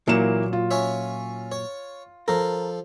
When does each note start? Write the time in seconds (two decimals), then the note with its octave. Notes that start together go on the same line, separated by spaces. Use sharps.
0.08 A#2 E3 F#3 A#3 E7
0.53 F4
0.71 C#4 C#5 E5
1.52 C#5
2.28 F3 A4 A#4